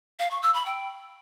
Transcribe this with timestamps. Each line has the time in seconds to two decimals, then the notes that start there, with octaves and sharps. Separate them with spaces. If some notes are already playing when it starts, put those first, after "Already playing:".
0.19 F5
0.31 C#6
0.42 E6
0.54 B5
0.66 G5